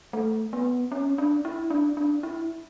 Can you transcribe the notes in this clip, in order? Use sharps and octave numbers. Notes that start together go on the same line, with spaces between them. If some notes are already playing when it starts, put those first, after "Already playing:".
A3
B3
C#4
D4
E4
D4
D4
E4